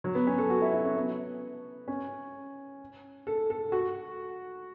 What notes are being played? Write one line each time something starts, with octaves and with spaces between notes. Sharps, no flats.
F#3
B3
C#4
A4
F#4
E4
E4
C#4
B3
C#4
A4
A4
F#4